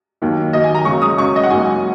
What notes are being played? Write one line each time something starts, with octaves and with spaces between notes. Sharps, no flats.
D#2 D#3 F#3 A#3
D#2 D#3 F#3 A#3 D#5
G#5
A#5
C#2 C#3 F#3 C#6
D#6
C#2 C#3 F#3 C#6
D#5
F#5
G#2 F#3 A#3 G#5